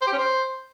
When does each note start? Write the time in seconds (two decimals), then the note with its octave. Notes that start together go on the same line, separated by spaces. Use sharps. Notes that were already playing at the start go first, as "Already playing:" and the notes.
0.02 C5
0.07 G4
0.13 C#4
0.18 C5